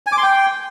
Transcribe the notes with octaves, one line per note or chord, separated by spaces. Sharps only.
G#5
D6
C6
G5